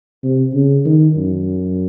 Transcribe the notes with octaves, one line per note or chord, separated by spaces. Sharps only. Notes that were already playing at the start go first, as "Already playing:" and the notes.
C3
C#3
D#3
F#2